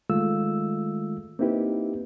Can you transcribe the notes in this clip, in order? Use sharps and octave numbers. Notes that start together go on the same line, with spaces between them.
D#3 G#3 A3 F4 E6
A#3 C4 D#4 E4 G4 B4